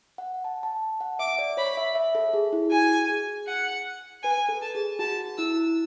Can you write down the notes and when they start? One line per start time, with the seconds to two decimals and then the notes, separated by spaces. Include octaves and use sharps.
0.18 F#5
0.44 A5
0.63 A5
1.00 F#5
1.19 E5 D6
1.39 D5
1.57 C#5 B5
1.77 E5
1.95 E5
2.15 A4
2.34 G#4
2.53 E4
2.72 F#4 G#5
3.09 G#4
3.47 F#5
4.23 B4 G#5
4.49 A4
4.62 A5
4.75 G#4
4.99 F#4 A5
5.38 E4 E6